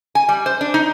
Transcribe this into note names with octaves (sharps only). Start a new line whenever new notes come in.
G#5
G3
C5
D4
D#4